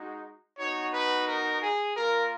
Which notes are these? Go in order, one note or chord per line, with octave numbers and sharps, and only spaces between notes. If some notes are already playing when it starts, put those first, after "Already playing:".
Already playing: G#3 D#4 F#4
B3 D#4 F#4 C#5
B4
A#4
G#4
A#3 F4 A#4